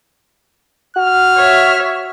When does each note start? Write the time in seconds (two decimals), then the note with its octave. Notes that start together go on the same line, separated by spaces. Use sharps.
0.97 F#4 F6
1.36 C#5 E5